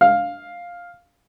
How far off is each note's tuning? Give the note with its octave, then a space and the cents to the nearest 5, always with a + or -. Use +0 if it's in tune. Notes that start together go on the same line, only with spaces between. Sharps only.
F5 +5